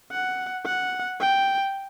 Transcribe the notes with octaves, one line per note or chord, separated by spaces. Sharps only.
F#5
F#5
G5